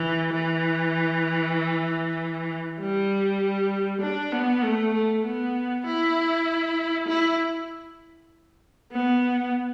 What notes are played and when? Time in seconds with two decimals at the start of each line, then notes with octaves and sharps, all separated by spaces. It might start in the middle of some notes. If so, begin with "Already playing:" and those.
Already playing: E3
0.34 E3
2.80 G3
4.02 D4
4.33 B3
4.64 A3
4.94 A3
5.25 B3
5.87 E4
7.08 E4
8.92 B3